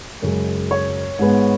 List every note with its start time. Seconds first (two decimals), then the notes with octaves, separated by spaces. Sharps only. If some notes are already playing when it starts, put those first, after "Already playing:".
0.22 F#2 C#3 G#3
0.71 C#5
1.19 G#2 G#3 B3